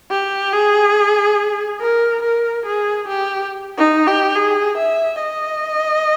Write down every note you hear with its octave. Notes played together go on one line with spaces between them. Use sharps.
G4
G#4
A#4
A#4
G#4
G4
D#4
G4
G#4
E5
D#5